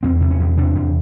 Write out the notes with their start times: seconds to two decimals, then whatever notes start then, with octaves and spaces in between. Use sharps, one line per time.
0.03 E2 C4
0.21 C3
0.31 C#4
0.40 E2
0.57 C3 D4
0.75 E2